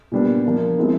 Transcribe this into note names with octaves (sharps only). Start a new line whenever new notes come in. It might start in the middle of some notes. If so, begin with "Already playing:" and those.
A#2 G3 B3 D4
F3 A#3 D4
F3 G#3 C4 E4